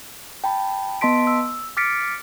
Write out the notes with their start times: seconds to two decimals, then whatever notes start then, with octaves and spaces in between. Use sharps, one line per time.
0.44 G5 A5 B5
1.01 B3 D#5 A5 C6 B6 D7
1.27 E6
1.77 D6 F6 A6 B6 C#7 D7